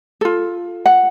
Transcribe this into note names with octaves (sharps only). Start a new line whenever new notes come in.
F4 A4
F#5